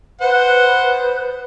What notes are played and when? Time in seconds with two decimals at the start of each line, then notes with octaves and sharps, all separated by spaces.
0.21 B4 C5 F#5